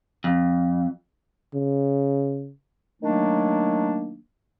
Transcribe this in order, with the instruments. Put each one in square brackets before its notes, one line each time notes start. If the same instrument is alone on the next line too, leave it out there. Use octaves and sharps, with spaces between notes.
[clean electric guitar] F2
[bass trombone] C#3
[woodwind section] D#3 F#3 A3 A#3 D4